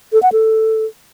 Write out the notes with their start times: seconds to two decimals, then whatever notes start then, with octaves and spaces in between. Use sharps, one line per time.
0.13 A4
0.23 F#5
0.33 A4